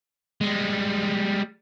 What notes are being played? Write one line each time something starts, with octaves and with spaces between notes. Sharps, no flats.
G3 G#3